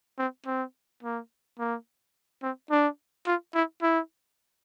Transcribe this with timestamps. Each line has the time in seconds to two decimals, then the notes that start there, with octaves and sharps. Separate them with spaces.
0.18 C4
0.46 C4
1.03 A#3
1.59 A#3
2.43 C4
2.71 D4
3.26 F4
3.55 E4
3.82 E4